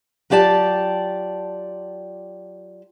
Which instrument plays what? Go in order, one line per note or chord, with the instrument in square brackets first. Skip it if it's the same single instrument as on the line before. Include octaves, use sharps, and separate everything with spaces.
[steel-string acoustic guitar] F#3 F4 G4 D5 A5